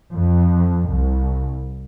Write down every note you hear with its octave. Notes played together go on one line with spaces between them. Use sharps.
F2
C2